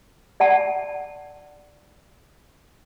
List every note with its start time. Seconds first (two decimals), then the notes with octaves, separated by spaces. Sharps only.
0.40 D5 F#5 A5